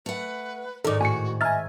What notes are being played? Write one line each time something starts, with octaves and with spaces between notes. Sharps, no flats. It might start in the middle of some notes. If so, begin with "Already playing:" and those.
A3 B4 F#5
G#2 D#3 D#4 A4 A#4 D5
A2 F#4 G#5 C#7
D#5 E5 G#5 A#5 F6 A6